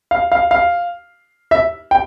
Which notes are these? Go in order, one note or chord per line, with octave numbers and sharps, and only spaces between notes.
F5
F5
F5
E5
G5